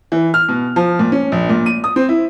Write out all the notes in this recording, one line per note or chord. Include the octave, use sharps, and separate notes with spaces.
E3
F6
B2
F3
A#2
C#4
A#1
A#2
D#7
D#6
C4
E4